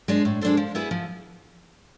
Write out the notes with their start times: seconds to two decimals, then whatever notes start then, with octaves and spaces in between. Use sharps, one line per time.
0.08 G#3 D4 A4 C5
0.25 A2
0.41 G#3 D4 A4 C5
0.57 F3
0.75 B3 E4 G#4 B4
0.91 F3